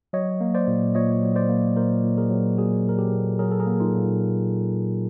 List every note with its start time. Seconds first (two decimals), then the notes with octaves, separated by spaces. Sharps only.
0.13 F#3 C#5 D#5
0.41 A#3
0.54 C5 D5
0.67 A#2
0.95 A#2 C#5 D#5
1.23 F#3
1.36 C5 D5
1.49 A#3
1.77 A#2 A#4 C5
2.04 A#2
2.18 G#4 A#4
2.30 F#3
2.58 A#3 F#4 G#4
2.86 A#2 A#4
2.98 G4 A4
3.12 A#2
3.39 F#3 G#4 A#4
3.51 A4
3.60 G#4 A#4
3.66 A#3
3.80 D#4 F4
3.94 A#2